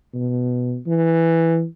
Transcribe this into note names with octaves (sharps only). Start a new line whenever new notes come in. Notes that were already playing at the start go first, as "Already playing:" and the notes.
B2
E3